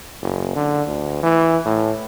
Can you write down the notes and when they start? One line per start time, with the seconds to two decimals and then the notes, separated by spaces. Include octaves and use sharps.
0.22 F#1
0.55 D3
0.87 D2
1.23 E3
1.65 A2